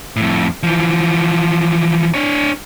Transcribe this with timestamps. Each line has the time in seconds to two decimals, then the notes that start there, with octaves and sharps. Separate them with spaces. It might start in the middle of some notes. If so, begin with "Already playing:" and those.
0.16 F2 A2
0.63 E3 F3
2.14 D4 C#5